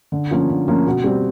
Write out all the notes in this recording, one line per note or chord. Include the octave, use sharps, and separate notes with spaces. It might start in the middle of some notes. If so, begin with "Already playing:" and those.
D3
F3 A#3 C#4
D3
F3 A#3 C#4
B2
G3 C4